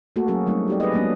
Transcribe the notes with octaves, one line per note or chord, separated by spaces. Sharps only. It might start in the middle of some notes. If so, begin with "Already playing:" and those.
A3 A#3 F#4 A4
F#3 C#4 F#4 G#4 A#4
F#3 G3 A3 C4 D#4
D#4 G4 D5
G#4 B4 D5 D#5
F#3 G#3 A#3 B3 C#4 D4